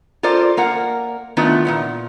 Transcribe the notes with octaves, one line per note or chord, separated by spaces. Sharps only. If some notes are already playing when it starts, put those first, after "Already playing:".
F4 A4 A#4 C5 D5
A#3 A#4 F#5
D#3 A3 B3 D4 E4 F4
A#2 G#3 F#5